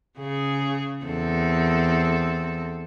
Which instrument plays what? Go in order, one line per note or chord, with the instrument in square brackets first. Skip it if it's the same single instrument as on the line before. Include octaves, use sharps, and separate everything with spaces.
[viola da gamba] C#3 G#4
E2 C4 A4